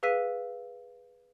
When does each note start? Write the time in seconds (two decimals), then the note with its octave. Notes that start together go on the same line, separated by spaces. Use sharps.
0.03 G#4 B4 F5 E6 B6 D#7